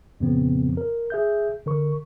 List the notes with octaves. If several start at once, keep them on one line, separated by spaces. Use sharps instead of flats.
F2 A#2 C#3 F3 B3 C4
A#4
G#4 E5 G6
D3 A#4 C#6